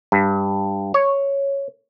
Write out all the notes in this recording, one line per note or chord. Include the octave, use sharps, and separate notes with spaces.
G2
C#5